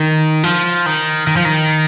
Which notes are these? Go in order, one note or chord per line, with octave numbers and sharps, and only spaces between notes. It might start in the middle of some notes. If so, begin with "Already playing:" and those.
Already playing: D#3
F3
D#3
D#3
F3
D#3